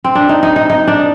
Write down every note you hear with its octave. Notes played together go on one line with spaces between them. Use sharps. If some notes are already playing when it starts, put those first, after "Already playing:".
C4
D4
D#4
D#4
D#4
D#4
D4